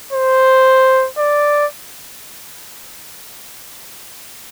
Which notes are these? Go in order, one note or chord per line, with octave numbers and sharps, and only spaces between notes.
C5
D5